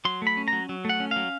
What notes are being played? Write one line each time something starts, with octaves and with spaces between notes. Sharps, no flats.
F#3 C6
A3 B5
C#4
F#3 A#5
F#3
A3 F#5
C#4
F#3 F5